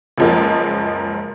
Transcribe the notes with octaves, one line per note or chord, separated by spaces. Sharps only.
C#2 F#2 F3 G#3 A#3